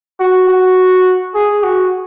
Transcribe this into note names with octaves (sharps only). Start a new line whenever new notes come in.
F#4
F#4
G#4
F#4